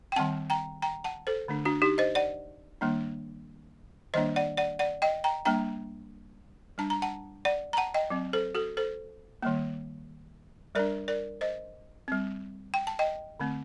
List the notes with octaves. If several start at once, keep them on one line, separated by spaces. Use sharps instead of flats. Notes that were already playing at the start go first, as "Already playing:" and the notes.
G5
D#3 G3 C4 F#5 A5
G5 A#5
G5 A#5
F#5 A5
A4 C5
D3 A3 D4
D4 F#4
D#4 G4
C5 D#5
D5 F#5
D#3 G3 A#3 D4
D#3 G3 A#3 D4 C5 D#5
D5 F#5
D5 F#5
D5 F#5
D#5 G5
G5 A#5
G3 A#3 D4 G5 A#5
G3 D4 A5
A#5
F#5 A5
D5 F#5
A#5
F#5 A5
D#5 G5
F#3 C4
A4 C5
F#4 A4
A4 C5
D#3 G3 A#3
G3 D4 A#4 D5
A#4 D5
C5 D#5
G3 C4
G5
A5
D#5 G5
D3 A3 C4